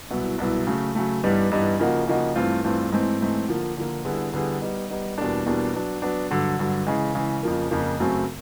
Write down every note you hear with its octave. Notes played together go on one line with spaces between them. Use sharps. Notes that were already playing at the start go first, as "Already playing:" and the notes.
C2 B2 F#3 B3 E4
C2 B2 F#3 B3 E4
C#3 F#3 A3
C#3 F#3 A3
G2 E3 G3 B3 D#4
G2 E3 G3 B3 D#4
C#3 F3 A#3 D#4 F#4
C#3 F3 A#3 D#4 F#4
G2 E3 A3 C4 F4
G2 E3 A3 C4 F4
G#2 E3 A3 C4
G#2 E3 A3 C4
D3 F3 A#3
D3 F3 A#3
D3 G3 B3 E4 G#4
D3 G3 B3 E4 G#4
G3 B3 D#4
G3 B3 D#4
E2 B2 G3 A#3 D4
E2 B2 G3 A#3 D4
F#3 B3 D4
F#3 B3 D4
G2 D3 F#3
G2 D3 F#3
C#3 E3 G#3
C#3 E3 G#3
F2 C#3 F3 A#3
F2 C#3 F3 A#3
F#2 C#3 F#3 A3 C4